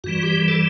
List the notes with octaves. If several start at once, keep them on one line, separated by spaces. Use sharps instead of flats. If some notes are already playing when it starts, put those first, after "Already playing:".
G2 E3 G3 F#4
G4
A4